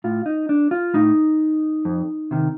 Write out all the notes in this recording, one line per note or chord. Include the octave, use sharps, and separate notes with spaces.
A2 F4
D#4
D4
F4
A2 D#4
F2
C3 D#3